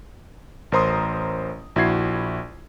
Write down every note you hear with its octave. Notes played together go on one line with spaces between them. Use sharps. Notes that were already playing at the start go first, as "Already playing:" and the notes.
A1 A#4 C5 A#5 C6 D#6
A#1 E4 F#4 G#6 C7